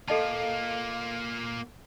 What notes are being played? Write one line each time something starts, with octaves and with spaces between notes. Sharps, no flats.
A#3 F4 A4 D#5 F5 A5